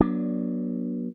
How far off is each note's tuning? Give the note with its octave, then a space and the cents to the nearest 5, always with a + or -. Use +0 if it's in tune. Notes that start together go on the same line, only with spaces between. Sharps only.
F#3 +0 B3 -45 D4 +0